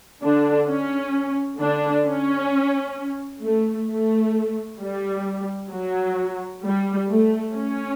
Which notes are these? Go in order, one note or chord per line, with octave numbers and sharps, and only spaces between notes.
D3 D4
C#4
D3 D4
C#4
A3
A3
G3
F#3
G3
A3
C#4